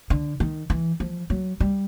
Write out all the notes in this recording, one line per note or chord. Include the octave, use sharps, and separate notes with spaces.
D3
D#3
E3
F3
F#3
G3